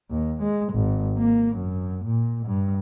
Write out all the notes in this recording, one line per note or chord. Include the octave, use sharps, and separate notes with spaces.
D#2
G#3
G#1
A#3
F#2
A#2
G2